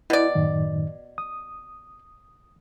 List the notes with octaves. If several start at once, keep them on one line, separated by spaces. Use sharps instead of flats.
B2 E4 D5
F#2 A2 D#3
D#6